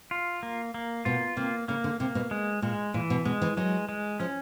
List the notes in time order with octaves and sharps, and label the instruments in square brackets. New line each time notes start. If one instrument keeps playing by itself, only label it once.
[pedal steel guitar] F4
A#3
A#3
[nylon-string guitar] B2 [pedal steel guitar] F4
[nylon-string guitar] C3 [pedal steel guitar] A#3
[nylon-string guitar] C#3 [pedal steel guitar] A#3
[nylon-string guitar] D3
[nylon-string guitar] C3 [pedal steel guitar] A#3
[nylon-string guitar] B2
[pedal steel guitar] G#3
[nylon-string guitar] A#2 [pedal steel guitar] G#3
[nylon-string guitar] A#2 [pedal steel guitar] E3
[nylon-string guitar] B2
[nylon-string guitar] B2 [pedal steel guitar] G#3
[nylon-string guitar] E3
[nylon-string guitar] F#3 [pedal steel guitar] G#3
[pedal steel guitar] G#3
[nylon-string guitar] F3 [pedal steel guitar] C#4